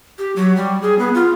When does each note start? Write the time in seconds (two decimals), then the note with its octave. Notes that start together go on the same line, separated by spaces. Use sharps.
0.19 G4
0.36 F#3
0.56 G3
0.82 G#4
0.99 B3
1.14 F4